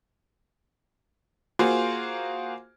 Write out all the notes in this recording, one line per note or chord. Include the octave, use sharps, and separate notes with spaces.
A#3 F4 F#4 G#4 C5